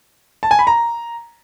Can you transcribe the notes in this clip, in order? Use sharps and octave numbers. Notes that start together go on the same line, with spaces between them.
A5
G#5
B5
A#5